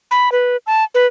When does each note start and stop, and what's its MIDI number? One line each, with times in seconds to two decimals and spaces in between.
0.11 0.32 83
0.32 0.57 71
0.67 0.84 81
0.94 1.06 71